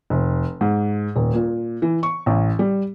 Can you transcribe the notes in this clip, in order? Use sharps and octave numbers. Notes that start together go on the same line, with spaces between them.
F1
G#2
D#1
A#2
E3
C#6
A1
G3